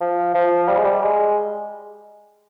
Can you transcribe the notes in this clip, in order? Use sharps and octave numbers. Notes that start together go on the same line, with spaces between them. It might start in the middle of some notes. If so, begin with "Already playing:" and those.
F3
F3
G3
G#3
G3
G#3